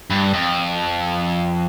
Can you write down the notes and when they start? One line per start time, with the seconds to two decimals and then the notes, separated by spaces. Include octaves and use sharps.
0.10 G2
0.34 F2